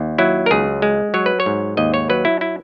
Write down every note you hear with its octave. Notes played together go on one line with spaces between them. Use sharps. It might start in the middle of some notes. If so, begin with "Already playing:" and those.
Already playing: D#2
F#3 E4
A#4
C#2 G#4
G#3
F#3 C#5
B4
C#5
G#2
D#2 D#5
C#5
F#3 B4
E4
E4